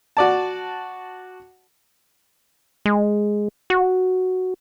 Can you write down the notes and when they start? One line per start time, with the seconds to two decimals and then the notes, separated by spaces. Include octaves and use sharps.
0.17 F#4 D5 A5
2.86 G#3
3.70 F#4